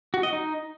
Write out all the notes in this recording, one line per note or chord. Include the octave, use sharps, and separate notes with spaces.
F#4
D#5
D#4